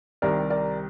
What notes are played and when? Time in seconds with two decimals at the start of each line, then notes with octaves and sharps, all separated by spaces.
0.22 C2 C3 D#3 G3 A#4 D5
0.50 A#4 D5